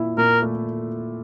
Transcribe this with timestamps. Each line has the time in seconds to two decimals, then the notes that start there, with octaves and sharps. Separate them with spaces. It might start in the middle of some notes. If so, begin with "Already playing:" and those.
Already playing: A#2 E4
0.18 A#2 A#4
0.42 A3